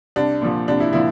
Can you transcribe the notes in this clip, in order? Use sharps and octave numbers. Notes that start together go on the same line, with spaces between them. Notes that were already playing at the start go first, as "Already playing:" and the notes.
C2 D4
A#2 F3
C2 D4
E4
A#2 F3 E4